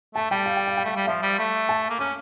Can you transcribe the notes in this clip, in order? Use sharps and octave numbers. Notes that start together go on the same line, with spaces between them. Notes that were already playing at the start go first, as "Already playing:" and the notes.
A3 A5
G3 G5
F5
G5
F5
G5
A3 F5
G3
F3 E5
G3
A3
A5
A#3
C#4 D6